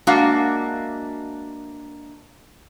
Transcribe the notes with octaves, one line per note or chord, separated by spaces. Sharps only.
G#3 A#3 D4 F#4 E5 F5